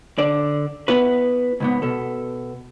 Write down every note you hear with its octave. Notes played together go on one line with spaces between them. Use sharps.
D3 D5
B3 E4 B4
C#2 G#2 B3
B2 A4